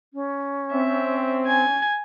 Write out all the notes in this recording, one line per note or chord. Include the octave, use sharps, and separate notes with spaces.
C#4
C4 E5
G#5 G#6